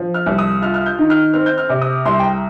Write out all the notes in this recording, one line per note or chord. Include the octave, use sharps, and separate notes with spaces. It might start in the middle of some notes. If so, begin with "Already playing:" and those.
Already playing: F3
F6
C2
D#6
F4 F6
F6
G6
D#3
F6
C4 F6
G6
F6
C3
D#6
C2 C6
G5
A#5